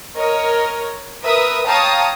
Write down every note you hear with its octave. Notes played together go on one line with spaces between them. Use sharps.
A#4 C#5 D#5
A#4 B4 E5 D#6
C#5 F5 G5 A5 A#5 D#6